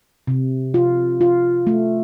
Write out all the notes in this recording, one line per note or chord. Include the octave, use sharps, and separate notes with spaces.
C3
F4
F4
A3